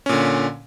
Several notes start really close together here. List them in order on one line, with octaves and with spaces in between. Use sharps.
C#4 A#2 D3